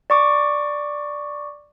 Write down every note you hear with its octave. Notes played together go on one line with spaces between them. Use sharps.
D5 C#6 D6